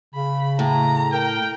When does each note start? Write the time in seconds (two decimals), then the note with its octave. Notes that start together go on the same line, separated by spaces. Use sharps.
0.15 C#3 B5
0.59 A2 A#5
1.12 A#4 G5